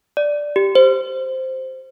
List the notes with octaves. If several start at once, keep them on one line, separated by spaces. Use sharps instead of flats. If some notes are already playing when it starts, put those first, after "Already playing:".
D5
G4
C5